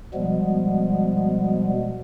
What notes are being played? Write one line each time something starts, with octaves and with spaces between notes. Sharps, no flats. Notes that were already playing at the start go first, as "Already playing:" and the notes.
B2 F3 G3 G#3 B3